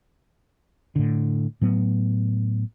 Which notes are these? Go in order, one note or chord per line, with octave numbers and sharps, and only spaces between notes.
A2 D3
A2 F#3 B3